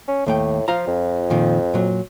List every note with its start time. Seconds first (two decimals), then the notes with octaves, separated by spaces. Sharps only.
0.08 C#4
0.26 D#2 A2 A3 G5
0.68 F3 F4 F5 A#5
0.87 F2
1.30 A#2 D#3 F3
1.74 A#2 F#3